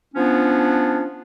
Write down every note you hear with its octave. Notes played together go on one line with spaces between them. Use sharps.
F3 B3 C#4 D4